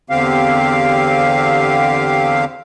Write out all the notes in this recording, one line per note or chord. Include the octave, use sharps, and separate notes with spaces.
E2 D3 C4 G4 F5